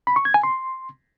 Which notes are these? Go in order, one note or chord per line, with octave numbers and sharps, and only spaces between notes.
B5
C#6
G#6
G#5
C6